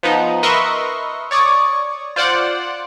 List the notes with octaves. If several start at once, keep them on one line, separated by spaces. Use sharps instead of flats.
F3 B3 D#4
A#4 B4 D#5 E5 C6 C#6
C#5 D5 C#6 D#6
F4 C5 D5 F#5